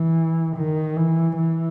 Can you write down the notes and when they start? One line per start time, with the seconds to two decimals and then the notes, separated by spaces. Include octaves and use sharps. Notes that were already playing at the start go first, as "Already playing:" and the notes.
Already playing: E3
0.57 D#3
0.96 E3
1.37 E3